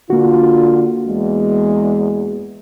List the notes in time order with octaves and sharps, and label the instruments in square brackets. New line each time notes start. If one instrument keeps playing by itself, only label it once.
[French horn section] D3 F4 [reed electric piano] A#3 F#4
[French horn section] E2 G#3